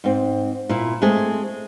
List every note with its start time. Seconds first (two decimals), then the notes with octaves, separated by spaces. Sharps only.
0.04 G#2 C4
0.69 A#2 E4
1.02 G#3 A3 C4 G#4